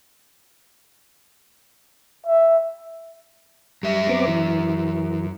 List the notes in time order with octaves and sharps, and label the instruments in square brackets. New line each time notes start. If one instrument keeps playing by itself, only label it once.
[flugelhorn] E5
[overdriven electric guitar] F#2 E5 [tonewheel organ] G3
[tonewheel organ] B3 C4 D6
E3